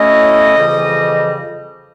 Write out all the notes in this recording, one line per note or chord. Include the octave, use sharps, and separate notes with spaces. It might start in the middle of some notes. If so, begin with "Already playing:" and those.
Already playing: A2 F#3 A3 C#4 E4 D#5
F2 C#3 E3 G3